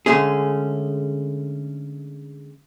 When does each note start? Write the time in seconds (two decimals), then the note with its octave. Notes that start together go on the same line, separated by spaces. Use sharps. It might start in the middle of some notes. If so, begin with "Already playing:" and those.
0.06 D3 G#3 A3 C#4 G#4